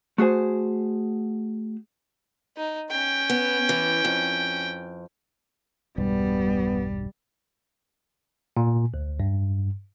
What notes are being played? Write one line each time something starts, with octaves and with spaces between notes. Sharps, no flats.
A3 F#4 G#4 C5 G#5
D#4
C#4 G5
B3
E3
F2
E1 B1 G2 G3 B3
A#2
D2
G2